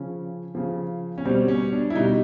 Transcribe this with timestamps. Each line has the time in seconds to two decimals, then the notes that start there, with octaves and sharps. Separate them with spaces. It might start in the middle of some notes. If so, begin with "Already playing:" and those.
Already playing: C#3 F3 C#4
0.55 C#3 F3
1.18 C#4
1.25 B2 G3 C4
1.48 C#4
1.73 D4
1.90 E4
1.95 B2 G3 D#4